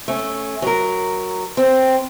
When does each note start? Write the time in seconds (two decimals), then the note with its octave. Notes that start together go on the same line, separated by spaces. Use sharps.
0.08 A3 C#4
0.62 F#3 A#4
1.57 C4